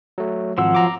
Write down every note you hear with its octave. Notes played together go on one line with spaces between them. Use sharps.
F#3 A3
G#1 F3 F#3 F#5 E6
A#5 D6